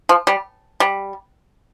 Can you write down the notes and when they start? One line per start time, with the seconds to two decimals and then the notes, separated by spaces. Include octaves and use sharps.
0.09 F3
0.27 G3
0.80 G3